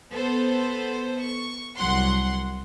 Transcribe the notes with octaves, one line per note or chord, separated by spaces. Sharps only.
B3 A4 C5
C#6
C2 F#3 F#5 C6